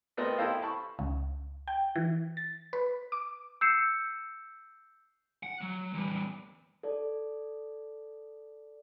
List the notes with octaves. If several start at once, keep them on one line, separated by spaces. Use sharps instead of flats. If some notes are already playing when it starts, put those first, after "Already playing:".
A3 B3 C4 A#4 D#5
E4 G4 A4 C5 D#5 F5
A5 B5 C#6
C#2
G5
E3
A6
B4
D6
E6 G6 C7 C#7 E7
F#5
F#3
E2 G3
A4 D5